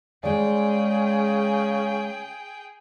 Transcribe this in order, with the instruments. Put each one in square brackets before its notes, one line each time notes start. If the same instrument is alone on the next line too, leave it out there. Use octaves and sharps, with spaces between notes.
[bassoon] C#3 [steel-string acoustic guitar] G#3 D5 [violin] G#4 G5